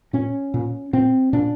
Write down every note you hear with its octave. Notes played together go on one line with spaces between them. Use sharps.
A#2 C#4
A#2
A#2 C4
A#2 D4